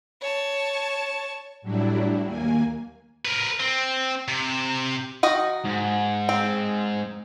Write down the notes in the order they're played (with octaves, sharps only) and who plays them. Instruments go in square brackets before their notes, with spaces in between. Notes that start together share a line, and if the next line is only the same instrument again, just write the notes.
[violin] C#5 A5
[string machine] A2 F#3 G3 D4 E4
D#2 A#3 G#5
[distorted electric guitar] A#4 B4
C4
C3
[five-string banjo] D#3 F#4 D#5
[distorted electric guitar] G#2
[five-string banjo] C4